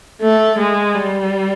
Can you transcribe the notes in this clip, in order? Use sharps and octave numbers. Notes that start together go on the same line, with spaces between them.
A3
G#3
G3